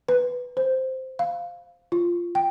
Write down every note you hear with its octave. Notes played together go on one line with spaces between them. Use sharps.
B4
C5
F5
F4
G5